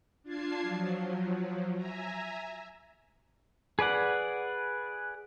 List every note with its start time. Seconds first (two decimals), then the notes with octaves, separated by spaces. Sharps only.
0.23 D4 F4 A5 G#6 C7
0.62 F3 F#3
1.74 E5 G#5 A#5
3.79 G#4 B4 D5 F#5